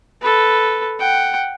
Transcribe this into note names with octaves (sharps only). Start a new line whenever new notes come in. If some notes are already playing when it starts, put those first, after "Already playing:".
A4 B4
F#5 G5